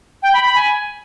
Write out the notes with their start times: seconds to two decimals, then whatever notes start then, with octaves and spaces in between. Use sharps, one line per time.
0.23 G5
0.33 B5
0.44 B5
0.55 G#5